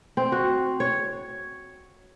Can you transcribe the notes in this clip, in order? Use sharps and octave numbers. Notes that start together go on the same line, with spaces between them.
C4
F#4
C#5